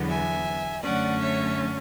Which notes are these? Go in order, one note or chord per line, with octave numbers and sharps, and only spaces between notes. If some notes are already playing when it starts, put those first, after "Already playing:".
Already playing: E2 D3 F#3 B3
E5 G#5
F#2 D3 F#3 A3 C#4 D5 F#5
C#5 E5